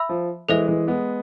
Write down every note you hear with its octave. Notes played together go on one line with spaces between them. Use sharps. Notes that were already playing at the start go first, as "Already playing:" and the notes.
Already playing: E5 B5 E6
F3
E3 G#3 A4 C5 E5
E3 G#3
G#3 B3